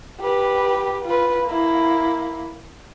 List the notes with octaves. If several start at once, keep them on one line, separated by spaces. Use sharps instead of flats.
G4 B4
F4 B4
A#3 E4